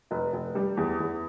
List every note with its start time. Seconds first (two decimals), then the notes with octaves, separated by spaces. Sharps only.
0.11 F1
0.33 F1
0.55 G3
0.77 E2
1.00 E2